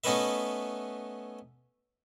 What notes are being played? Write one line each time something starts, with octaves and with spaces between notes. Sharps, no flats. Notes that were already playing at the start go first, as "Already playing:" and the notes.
A3 B3 C#4 D#4 B4 E5